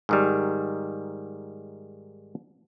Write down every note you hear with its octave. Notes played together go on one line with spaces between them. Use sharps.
G#2 D#3 G3